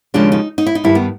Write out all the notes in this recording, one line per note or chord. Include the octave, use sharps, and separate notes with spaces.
D#2 C#3 F3 G#3 D4
D#4
D#4
E4
D#4
G2 D#3 G3 E4
B3